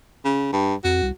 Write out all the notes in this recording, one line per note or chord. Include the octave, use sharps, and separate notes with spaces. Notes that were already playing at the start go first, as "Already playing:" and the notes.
C#3
G2
F2 F#4
C2